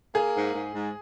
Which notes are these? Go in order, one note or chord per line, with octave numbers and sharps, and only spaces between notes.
A#3 G#4
G#2
G#2
G#2